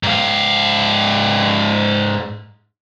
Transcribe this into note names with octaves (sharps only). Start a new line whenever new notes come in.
G#2 F5